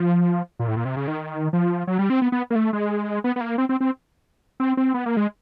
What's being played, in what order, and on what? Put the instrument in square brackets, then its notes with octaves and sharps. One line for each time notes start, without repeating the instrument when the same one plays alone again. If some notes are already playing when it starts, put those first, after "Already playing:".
Already playing: [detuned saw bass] F3
A#2
A2
A#2
C3
C#3
D#3
F3
F#3
G3
C4
B3
B3
A#3
A3
G#3
B3
B3
A#3
C4
C4
C4
C4
C4
B3
A#3
G#3